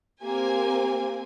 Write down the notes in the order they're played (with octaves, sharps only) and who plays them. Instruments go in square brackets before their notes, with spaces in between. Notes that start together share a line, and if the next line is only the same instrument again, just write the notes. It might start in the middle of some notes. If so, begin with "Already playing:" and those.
[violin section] A#3 C4 G#5 [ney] G4